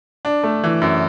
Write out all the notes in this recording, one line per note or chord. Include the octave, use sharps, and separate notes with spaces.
D4
A3
E3
F#2